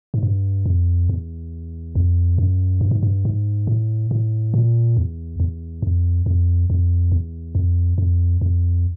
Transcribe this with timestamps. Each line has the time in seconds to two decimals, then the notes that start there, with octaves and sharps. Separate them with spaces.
0.14 G#2
0.23 G2
0.66 F2
1.09 E2
1.95 F2
2.38 F#2
2.81 G2
2.91 G#2
3.03 G2
3.25 G#2
3.67 A2
4.11 A2
4.54 A#2
4.97 E2
5.40 E2
5.82 F2
6.26 F2
6.70 F2
7.12 E2
7.55 F2
7.98 F2
8.41 F2